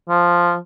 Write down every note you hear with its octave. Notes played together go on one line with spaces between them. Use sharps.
F3